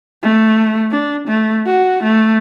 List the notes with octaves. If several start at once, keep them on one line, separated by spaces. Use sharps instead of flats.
A3
D4
A3
F#4
A3